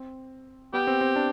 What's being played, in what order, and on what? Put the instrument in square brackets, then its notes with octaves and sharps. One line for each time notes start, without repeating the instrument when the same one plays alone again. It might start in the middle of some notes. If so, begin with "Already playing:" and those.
Already playing: [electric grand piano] C4
[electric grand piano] B3 [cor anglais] G4
[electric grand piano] C4
C4
D4